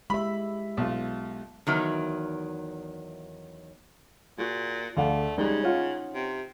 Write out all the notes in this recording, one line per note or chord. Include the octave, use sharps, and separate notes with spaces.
G#3 G4 E5 B5
B1 F4
E2 D#3 F#3
A#2 F#4 G#4
D2 A3 G#4 D5 F5 F#5
C#3 G3 G#3 D#4
C#4 D#4 F4 F#5
C3